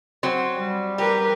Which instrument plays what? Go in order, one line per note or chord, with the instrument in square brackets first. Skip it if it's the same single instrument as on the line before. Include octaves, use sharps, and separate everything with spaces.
[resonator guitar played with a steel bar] F#3 C4
[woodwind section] G3
[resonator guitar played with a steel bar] G4 [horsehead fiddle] A#4 B4